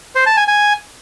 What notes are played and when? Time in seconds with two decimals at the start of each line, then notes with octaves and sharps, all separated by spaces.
0.15 C5
0.26 A5
0.37 G#5
0.48 G#5